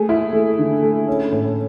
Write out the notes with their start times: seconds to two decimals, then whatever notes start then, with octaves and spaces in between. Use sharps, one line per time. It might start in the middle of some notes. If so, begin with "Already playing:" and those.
Already playing: A3 G#4
0.09 E4
0.33 A3
0.59 D3
0.82 A3
1.07 C#4
1.32 A2